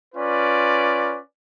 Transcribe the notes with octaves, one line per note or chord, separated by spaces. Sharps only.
C#4 F4 B4 D5